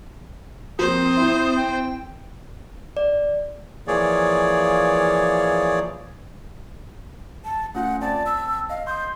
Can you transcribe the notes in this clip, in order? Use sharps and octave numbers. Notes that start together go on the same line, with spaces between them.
F3 A#3 C4 C5 D#6
E4
G5
D5
E3 F3 A#3 G#4 C#5 D5
A5
A3 C#4 F4 F#5
C4 D5 A5 A6
E6
D#5 F5
C6 D#6 G6